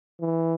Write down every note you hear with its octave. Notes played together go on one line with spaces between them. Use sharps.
E3